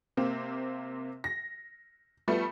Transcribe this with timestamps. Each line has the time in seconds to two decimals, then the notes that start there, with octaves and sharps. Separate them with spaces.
0.17 C3 A#3 C4
1.24 A#6
2.28 F3 G3 A3 B3